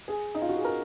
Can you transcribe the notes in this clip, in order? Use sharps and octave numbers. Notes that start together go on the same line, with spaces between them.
G#4
D#4
F4
F#4
G#4
A#4